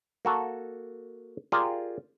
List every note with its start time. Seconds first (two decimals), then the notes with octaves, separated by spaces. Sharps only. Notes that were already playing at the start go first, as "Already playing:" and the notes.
0.25 A#3 F#4 A4
1.52 F4 G4 G#4 A#4 D5